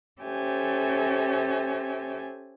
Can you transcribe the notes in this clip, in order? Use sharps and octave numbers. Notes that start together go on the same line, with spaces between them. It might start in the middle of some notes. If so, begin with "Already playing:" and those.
C#4 G4 A4 C5 E5 G#5